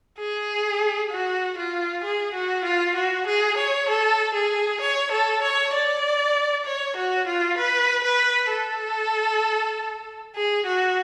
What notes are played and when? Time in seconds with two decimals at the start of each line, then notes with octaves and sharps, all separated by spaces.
0.18 G#4
1.11 F#4
1.57 F4
2.04 G#4
2.34 F#4
2.64 F4
2.96 F#4
3.27 G#4
3.57 C#5
3.89 A4
4.34 G#4
4.81 C#5
5.11 A4
5.42 C#5
5.73 D5
6.65 C#5
6.96 F#4
7.27 F4
7.57 B4
8.04 B4
8.50 A4
10.35 G#4
10.66 F#4